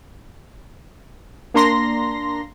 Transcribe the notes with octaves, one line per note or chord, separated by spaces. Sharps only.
A#3 D4 A#5 C6 A#6